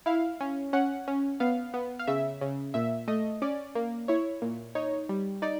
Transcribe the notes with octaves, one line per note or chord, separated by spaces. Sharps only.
E4 F5
C#4
C#4 F#5
C#4
B3 F5
B3
F5
C#3 E5
C#3
A#2 E5
A3 D#5
C#4 D5
A#3
E4 C#5
A#2
D#4 C#5
G3
D#4 D5